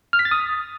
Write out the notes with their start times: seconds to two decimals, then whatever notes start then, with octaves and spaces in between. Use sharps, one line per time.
0.13 F6
0.19 B6
0.25 A6
0.31 D#6